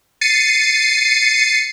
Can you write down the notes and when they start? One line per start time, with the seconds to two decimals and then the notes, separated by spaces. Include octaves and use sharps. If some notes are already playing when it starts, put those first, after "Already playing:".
0.21 A6 C7 C#7 D#7